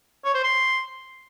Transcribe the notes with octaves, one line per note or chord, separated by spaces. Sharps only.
C#5
C5
C6